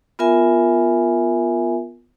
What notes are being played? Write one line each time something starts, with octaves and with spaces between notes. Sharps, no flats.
B3 F4 A#4 E5 G#5